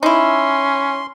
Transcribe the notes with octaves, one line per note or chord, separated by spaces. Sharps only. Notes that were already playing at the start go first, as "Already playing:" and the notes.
C#4 D#4 E4 C6